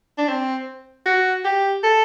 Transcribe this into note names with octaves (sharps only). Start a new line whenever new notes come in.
D4
C4
F#4
G4
A4